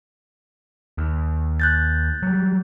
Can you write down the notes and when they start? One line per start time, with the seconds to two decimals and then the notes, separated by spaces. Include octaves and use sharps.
0.98 D#2
1.60 F#6 G6 A6
2.23 F#3 G3